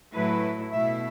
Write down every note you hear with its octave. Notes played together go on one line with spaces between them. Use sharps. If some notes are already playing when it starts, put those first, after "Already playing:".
A2 F#3 A3 E4 B4
B2 A3 E4 E5